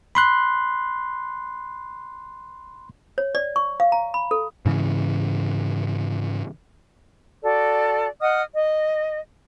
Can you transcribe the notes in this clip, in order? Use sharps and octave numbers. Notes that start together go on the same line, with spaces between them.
B5 C6 F#6
C#5
D5
C#6
F5
A#5
B5
A4
G#2 C#3 E3
F#4 A4 D5
D#5 F#5 D#6 F6
D#5